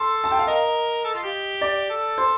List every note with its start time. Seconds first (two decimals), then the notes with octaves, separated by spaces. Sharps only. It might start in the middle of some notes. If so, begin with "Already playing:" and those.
Already playing: A4 C6
0.24 A5
0.31 G5
0.39 F5
0.47 A#4 D#5
1.04 A4
1.14 F4
1.23 G4
1.61 D5
1.90 A4
2.18 C5